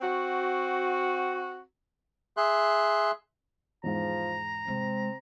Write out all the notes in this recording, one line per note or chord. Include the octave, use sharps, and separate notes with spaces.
C4 F#4
G#4 E5 C6 F#6
E2 G#2 F3 A#5
C3 G#3 C4